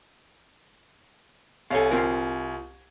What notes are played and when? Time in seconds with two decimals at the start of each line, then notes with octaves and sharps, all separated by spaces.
1.70 C2 A4 C#5 F5 G#5
1.91 C4 F4 A#4